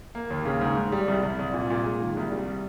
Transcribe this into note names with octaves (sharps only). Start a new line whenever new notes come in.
A#3
D#2
C#3
G#2
G#2
G3
C2
C2
C2
A#2
A#2
G#3
D#3
C2
G3